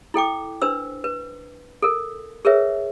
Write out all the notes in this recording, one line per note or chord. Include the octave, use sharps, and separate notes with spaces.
E4 A4 G5 D6
D4 B4 C5 E6
B4
A4 A#4
G#4 A#4 B4 C#5 E5